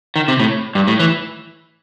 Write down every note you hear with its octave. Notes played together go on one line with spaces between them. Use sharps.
D#3
C3
A2
G2
A2
E3